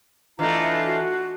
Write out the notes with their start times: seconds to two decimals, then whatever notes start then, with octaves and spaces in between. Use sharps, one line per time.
0.39 E3 A3 D4 F4 D#5 A#5
0.85 F#4